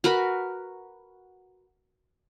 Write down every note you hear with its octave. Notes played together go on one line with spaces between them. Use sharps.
F#4 A#4 B4 B5